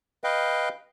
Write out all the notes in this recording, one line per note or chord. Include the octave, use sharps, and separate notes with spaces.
B4 D#5 F5 G5